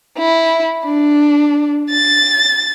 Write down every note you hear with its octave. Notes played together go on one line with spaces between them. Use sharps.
E4
D4
A6